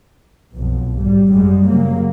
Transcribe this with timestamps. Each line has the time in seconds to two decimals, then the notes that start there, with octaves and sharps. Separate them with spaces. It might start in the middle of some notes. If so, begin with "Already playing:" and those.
0.53 B1 F2
0.95 G#1 G3
1.30 F#2 G3 G#3
1.66 C#3 F#3 A#3